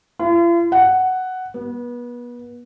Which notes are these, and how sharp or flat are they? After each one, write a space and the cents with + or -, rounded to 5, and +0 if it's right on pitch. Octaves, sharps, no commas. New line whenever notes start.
F4 -45
F#5 +5
B3 -30